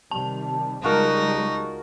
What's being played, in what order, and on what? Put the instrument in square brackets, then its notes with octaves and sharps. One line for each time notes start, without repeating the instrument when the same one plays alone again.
[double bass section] C3 D#3 G3 [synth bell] A5
[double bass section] C#2 G3 G#3 [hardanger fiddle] D#4 [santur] F4 F#4 A#4